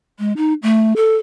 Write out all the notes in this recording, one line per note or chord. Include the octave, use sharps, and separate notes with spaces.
G#3
D#4
A3
A4